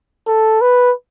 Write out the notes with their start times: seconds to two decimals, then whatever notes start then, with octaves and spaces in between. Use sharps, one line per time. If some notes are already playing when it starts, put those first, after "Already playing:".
0.27 A4
0.61 B4